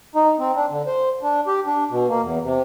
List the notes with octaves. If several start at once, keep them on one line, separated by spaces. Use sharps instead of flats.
D#4
C4
D4
D3
C5
D4
G4
D4
B2
A#3
E2
C3